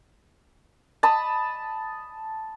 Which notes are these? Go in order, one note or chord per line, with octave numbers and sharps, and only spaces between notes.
A5 B5 D#6